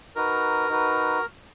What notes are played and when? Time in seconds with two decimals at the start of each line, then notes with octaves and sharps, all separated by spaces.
0.16 D#4 F#4 A#4 B4
0.69 D#4 F#4 B4